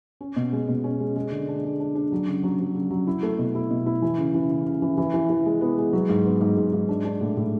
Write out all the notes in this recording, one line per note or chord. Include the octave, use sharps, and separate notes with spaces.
C#4
B2
G#3
B2
C#4
G#3
G#3
D3
D4
G#3
D4
D4
F#3
C#3
F#3
F#3
C#3
F#3
E4
A3
B2
E4
B2
E4
E3
C#3
E3
C#3
C#3
E3
E3
E3
E3
G#3
B3
G#3
F#3
G#2
B3
G#2
G#2
G#2
D4
D4
A2
A2